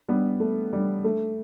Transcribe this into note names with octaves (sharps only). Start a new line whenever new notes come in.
G3 B3
A3
G3
A3